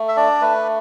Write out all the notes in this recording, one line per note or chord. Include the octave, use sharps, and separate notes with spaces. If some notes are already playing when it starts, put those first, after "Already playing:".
Already playing: A3
E5
D4 D5
A3 B4